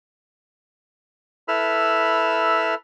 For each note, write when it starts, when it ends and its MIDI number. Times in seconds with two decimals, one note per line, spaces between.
1.48 2.74 64
1.48 2.74 69
1.48 2.74 71
1.48 2.74 83
1.48 2.74 88
1.48 2.74 89